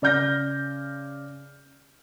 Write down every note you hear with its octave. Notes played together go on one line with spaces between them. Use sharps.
C#3 D5 F6 G6 A#6